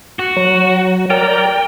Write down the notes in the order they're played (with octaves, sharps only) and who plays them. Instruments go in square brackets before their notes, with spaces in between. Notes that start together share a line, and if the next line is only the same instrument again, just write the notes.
[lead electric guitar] F#4
[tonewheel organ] F#3
[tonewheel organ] A#4 D5 A#5 [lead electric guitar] G5